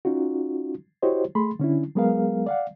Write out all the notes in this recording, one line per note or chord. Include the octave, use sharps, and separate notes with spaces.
C#4 D#4 F4 F#4
E4 F#4 G4 C5 C#5 D#5
A3 G#4 B5 C6
D3 C#4 D4 E4
F#3 G#3 B3 G#4 A#4 F5
D5 F5 F#5